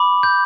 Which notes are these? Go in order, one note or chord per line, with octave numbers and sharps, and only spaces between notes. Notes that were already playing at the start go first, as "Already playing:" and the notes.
Already playing: B5 D6
G6